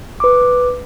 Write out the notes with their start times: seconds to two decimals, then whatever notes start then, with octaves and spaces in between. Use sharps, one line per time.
0.20 B4 D6